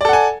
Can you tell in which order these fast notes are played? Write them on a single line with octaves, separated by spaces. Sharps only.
D5 A4 F#5 G#5